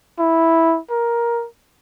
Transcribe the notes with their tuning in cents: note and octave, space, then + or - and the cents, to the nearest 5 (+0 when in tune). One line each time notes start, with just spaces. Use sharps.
E4 -5
A#4 +10